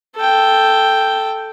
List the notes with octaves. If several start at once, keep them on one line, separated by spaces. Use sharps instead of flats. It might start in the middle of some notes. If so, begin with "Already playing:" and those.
A4 G5